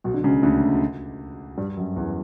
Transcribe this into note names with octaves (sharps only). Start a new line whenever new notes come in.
B1 B2
D3
C#2 C#3
D2 D3
G2 G3
F#2 F#3
E2 E3